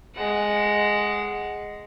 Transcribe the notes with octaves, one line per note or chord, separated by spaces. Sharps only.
G#3 F#5